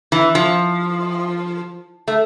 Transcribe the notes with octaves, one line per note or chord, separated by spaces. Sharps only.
E3
F3
A3